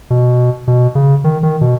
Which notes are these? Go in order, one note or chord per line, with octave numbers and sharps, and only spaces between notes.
B2
B2
C#3
D#3
D#3
B2